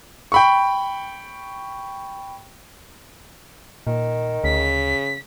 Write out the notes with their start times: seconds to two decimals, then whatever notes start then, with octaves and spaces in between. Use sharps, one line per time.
0.32 G5 B5 C#6
3.87 A#2 D#3
4.44 D2 C#3 B6